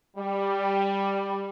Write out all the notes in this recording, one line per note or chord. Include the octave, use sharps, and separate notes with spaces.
G3